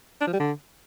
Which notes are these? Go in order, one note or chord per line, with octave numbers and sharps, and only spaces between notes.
D4
F3
G3
D3